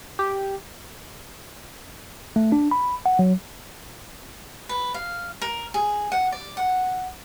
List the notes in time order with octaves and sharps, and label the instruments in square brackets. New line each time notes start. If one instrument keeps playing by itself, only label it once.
[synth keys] G4
[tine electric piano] A3
D4
B5
F#5
F#3
[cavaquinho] B4
F5
A#4
G#4
F#5
D5
F#5